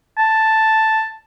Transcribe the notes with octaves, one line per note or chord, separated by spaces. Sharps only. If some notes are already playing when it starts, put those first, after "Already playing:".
A5